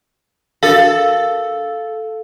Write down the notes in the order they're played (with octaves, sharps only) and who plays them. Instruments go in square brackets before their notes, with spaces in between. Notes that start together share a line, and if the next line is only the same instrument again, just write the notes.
[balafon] D4 F#4 A#4 [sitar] A4 [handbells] F5